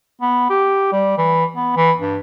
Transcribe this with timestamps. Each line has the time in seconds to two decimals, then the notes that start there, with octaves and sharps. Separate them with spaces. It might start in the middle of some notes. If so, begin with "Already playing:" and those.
0.21 B3
0.50 G4
0.92 G3
1.18 E3
1.56 B3
1.76 E3
1.99 G2